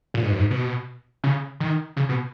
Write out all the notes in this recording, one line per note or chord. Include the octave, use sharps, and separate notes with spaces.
A#2
G#2
F#2
G#2
B2
C#3
D#3
C#3
B2